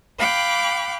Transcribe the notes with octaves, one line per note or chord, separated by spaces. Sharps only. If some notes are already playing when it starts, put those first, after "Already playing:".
F5 G5 B5 D6 F#6